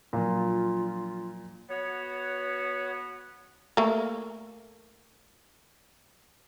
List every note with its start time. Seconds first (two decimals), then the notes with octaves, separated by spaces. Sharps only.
0.13 A#2 F3 F#3 D4 F4
1.69 B3 F#4 C#5
3.77 A3 A#3